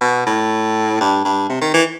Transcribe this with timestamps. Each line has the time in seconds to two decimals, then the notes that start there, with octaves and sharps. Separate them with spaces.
0.01 B2
0.26 A2
1.00 G2
1.25 G2
1.49 C3
1.61 D#3
1.74 E3